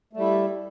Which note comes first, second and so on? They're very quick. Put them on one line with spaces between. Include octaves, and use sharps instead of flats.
A3 G3 E4